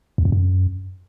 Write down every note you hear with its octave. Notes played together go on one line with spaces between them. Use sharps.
E2
F2
F#2